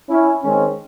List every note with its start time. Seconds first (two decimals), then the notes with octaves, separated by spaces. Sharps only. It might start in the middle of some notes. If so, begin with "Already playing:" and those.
0.09 C#4 E4
0.42 D#3 G#3 C4 C#4